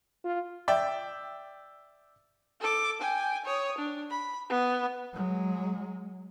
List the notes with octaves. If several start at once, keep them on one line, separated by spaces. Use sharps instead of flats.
F4
D5 E5 G5
A4 D6
G5 G#5
C#5 D#6
D4
B5
B3
F#3 G#3